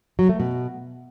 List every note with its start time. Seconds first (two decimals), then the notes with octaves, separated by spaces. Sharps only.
0.19 F#3
0.29 A3
0.39 B2